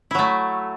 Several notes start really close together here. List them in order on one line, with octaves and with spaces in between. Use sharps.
E4 F#3 A3